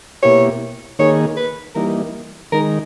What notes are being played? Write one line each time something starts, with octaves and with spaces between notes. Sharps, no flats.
B2 A#3 E4 G4 C#5
D#3 A#3 D#4 G#4 C#5
B4
E3 G3 A#3 D#4 A#4
D#3 G#3 D#4 A#4